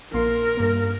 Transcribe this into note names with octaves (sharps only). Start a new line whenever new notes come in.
A#1 A#3 A#4 C6
G2 A#3